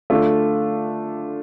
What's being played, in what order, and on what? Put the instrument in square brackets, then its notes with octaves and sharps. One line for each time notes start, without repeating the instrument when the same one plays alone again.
[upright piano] D3 A3 D4 F4